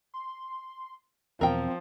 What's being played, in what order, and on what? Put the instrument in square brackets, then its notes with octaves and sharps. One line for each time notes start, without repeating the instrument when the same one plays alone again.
[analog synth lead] C6
[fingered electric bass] E2 B2 [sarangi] F3 [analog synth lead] C4 [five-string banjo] A#4 G5